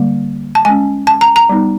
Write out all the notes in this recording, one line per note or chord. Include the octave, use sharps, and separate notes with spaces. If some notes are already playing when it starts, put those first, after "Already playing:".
Already playing: D3 G3 A#3
A5
G#3 C#4 G#5
A5
A#5
A#5
G3 B3 D#4